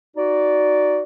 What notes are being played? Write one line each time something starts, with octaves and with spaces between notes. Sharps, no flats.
D#4 F#4 D5